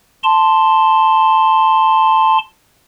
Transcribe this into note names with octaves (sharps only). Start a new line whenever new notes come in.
A5 C6